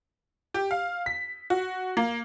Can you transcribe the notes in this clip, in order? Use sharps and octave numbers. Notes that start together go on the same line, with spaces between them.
G4
F5
B6
F#4
A#3